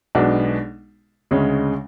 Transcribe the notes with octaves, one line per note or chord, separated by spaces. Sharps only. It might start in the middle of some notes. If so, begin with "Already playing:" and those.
B1 B2 G#3 B3 D4
D2 C#3 G#3 C#4